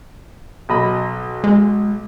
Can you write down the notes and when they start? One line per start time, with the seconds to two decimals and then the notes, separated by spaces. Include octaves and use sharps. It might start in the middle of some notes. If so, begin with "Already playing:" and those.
0.69 B1 D#5 B5
1.44 G#3